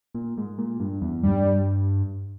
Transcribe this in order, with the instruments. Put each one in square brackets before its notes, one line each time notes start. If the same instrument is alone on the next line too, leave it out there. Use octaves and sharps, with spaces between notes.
[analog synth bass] A#2
G#2
A#2
G2
E2
[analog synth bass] G2 [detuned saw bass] G3